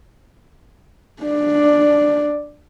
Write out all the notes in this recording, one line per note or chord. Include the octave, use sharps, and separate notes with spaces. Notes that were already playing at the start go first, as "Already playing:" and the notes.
D4 D5